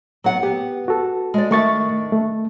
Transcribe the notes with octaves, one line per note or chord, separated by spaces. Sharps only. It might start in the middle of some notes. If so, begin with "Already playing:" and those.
F#3 B3 F#5
B3 G4
F#4 A4
G#3 D5
D#3 A3 D4 E5 C#6 A6
A3